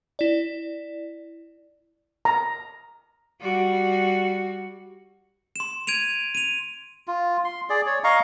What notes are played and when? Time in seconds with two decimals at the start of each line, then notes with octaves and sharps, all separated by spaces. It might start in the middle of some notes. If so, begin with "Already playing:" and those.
0.19 E4 D5
2.25 A#5
3.41 G3 F#4
5.56 C6 E7
5.87 G#6 D7 D#7 F7
6.35 D#7 F7
7.08 F4
7.45 C6
7.70 G#4 D5
7.86 C#5
8.04 D#5 F5 A#5 C#6